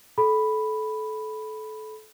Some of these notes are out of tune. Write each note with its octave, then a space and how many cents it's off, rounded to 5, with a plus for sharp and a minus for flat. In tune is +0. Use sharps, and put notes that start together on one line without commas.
A4 -25 B5 +0